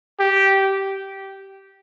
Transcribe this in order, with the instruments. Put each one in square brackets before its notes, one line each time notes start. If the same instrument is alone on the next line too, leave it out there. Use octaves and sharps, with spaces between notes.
[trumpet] G4